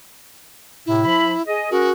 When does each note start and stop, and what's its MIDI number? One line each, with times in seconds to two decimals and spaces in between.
0.86 1.01 45
0.86 1.01 48
0.86 1.42 64
1.05 1.32 53
1.05 1.32 83
1.47 1.69 68
1.47 1.69 75
1.71 1.91 61
1.71 1.93 66
1.71 1.91 68
1.71 1.91 70